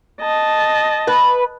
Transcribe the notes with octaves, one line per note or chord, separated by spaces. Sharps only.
D#5 A5
B4